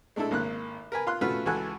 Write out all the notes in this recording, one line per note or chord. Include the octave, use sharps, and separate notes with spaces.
G#3 A3 D4 E4 A4
G#1 A#3 F#6
A#4 B4 G#5
F4 F5 C6 F#6
A3 C#4 F4 F#4 B4 F5
C#2 E3 F#4 A4 G#5 F#6